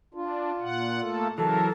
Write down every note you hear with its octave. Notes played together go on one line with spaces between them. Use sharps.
D4 F4
A#2 F#5
A3 A#3 A4
C#3 E3 F#3 A4 A#4